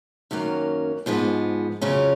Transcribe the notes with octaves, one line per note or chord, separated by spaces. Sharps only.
F#2 D#3 F#3 A#3 C#4
G#2 F3 G#3 B3
F2 C#3 F#3 C#4 F4